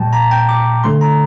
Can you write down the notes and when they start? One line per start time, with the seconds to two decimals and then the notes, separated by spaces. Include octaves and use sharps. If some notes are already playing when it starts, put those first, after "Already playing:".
Already playing: A#2 G3 G5 A5
0.13 A#5
0.31 G5
0.49 D6
0.84 D3 A3 C6
1.01 A#5